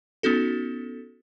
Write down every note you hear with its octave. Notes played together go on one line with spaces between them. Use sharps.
B3 C#4 D#4 F#4 A4